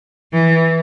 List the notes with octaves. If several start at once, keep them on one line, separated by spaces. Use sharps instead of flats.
E3